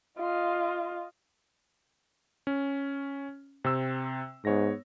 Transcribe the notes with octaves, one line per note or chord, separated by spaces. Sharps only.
F4 D#5
C#4
C3 C4 E6
G#2 B3 C#5 A#6